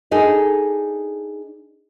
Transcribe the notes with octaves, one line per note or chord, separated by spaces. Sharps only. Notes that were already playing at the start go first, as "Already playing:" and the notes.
D4 D#4 G#4 A4